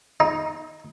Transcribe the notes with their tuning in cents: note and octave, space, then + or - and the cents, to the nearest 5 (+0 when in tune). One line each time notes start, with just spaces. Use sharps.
D#4 +10